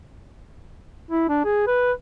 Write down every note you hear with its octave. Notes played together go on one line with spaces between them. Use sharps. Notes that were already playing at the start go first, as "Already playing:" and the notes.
E4
D4
G#4
B4